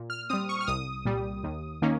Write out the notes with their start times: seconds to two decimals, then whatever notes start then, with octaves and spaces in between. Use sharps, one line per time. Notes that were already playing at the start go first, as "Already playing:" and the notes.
Already playing: A#2
0.10 F6
0.30 G3 C4 D#6
0.49 C#6
0.61 F6
0.67 C2 D#6
1.05 A#2 G3
1.44 D#2
1.82 D#3 A#3 C#4